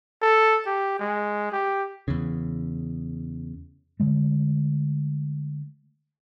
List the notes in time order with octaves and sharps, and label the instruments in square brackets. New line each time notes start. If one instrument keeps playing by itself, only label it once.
[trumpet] A4
G4
G#3
G4
[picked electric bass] E2 C#3
[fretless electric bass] D3 G#3 A3